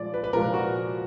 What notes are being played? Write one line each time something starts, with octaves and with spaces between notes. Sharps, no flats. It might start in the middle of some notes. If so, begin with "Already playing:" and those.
Already playing: A#2 F3 G#3 D5
B4
B4
A#2 F3 G#3 A#4
F#4